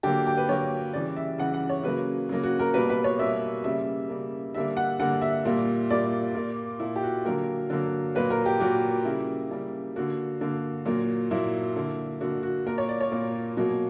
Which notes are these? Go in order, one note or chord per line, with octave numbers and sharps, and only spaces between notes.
D3 F#3 A#3 G4
G4
B4
D3 F#3 A#3 C#5
C#3 E3 G3 D5
E5
C#3 E3 G3 F#5
F#5
C#5
C#3 F#3 A#3 B4
C#3 F#3 A#3
F#4
A#4
B2 G3 A#3 B4
B4
C#5
B2 G3 A#3 E5
C#3 G3 A#3 E5
C#3 G3 A#3
D3 G3 A#3 E5
F#5
D3 G3 A#3 F#5
E5
A#2 G3 A#3
A#2 G3 A#3 D5
A#2 A#3
A#2 A#3 E4
G4
F#4
D3 F#3 A#3 A#4
D3 F#3 A#3
A#2 F#3 A#3 B4
A#4
G4
A#2 F#3 A#3 F#4
C#3 G3 A#3 E4
C#3 G3 A#3
D3 A#3 F#4
D3 A#3
A#2 F#3 A#3
A#2 F#3 A#3 E4
D3 A#3
D3 A#3 F#4
F#4
A#2 A#3 A#4
C#5
D5
C#5
A#2 A#3
B2 F#3 A#3